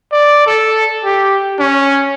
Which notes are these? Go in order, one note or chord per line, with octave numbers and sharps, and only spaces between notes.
D5
A4
G4
C#4